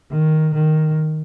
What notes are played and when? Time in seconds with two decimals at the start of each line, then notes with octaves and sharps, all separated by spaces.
0.12 D#3
0.55 D#3